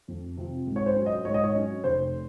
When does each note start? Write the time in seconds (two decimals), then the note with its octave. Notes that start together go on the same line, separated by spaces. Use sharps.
0.08 F2
0.37 C3 F3
0.67 G#2
0.76 C#5
0.86 C5
0.96 F#3 C#4
1.06 D#5
1.25 G#2 C#5
1.34 D#5
1.44 C#5
1.55 F#3 C#4
1.84 F1 C5